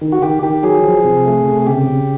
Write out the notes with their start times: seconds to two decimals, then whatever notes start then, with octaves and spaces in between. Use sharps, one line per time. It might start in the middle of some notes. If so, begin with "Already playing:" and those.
0.02 D#3
0.12 F#4
0.22 D#3 G4
0.43 D#3 G4
0.63 F#3 G#4
0.84 F3
1.05 C3
1.26 A3
1.46 C3
1.62 G#4
1.67 C#3 G4
1.87 C#3